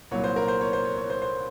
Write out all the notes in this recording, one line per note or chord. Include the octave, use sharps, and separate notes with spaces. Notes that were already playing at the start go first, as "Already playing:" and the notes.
C2 A#2 F#3 C#5
C5
A#4
C5
C#5
C5
C#5
C#5
C5
C5